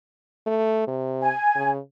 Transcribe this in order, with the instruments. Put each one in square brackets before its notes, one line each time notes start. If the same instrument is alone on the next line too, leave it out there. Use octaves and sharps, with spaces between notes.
[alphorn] A3
C3
[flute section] G#5
[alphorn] C#3